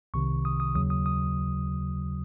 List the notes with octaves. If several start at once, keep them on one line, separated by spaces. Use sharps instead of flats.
C2 C3 D#3 C#6
D#6
D#6
D#2 C#3 F#3 D#6
D#6
D#6